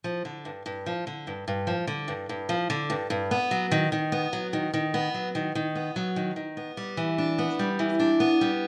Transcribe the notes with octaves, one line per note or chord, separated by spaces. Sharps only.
F3
D3
G2
G2
F3
D3
G2
G2
F3
D3
G2
G2
F3
D3
G2
G2
B3
F#3
D#3
D#3
B3
F#3
D#3
D#3
B3
F#3
D#3
D#3
B3
F#3
D#3
D#3
B3
G3
E3
D4
B3
G3
E3
D4
B3
G3